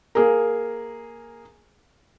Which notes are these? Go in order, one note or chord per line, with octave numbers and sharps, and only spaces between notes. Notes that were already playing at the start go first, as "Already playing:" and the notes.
A#3 G#4 A#4